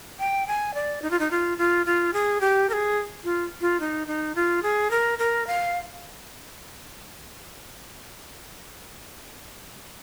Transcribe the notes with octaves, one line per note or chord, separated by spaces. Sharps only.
G5
G#5
D5
D#4
F4
D#4
F4
F4
F4
G#4
G4
A#4
G#4
F4
F4
D#4
D#4
F4
G#4
A#4
A#4
F5